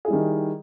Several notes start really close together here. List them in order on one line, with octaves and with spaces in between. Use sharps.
G#4 E4 G3 D#3